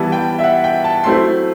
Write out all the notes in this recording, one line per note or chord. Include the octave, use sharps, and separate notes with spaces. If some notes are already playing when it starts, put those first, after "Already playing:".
Already playing: E3 G3 B3 E4 A5
G5
E5
F#5
G5
A5
F#3 A3 C4 E4 C6